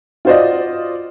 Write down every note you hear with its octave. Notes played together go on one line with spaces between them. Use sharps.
F4 F#4 C5 D5 D#5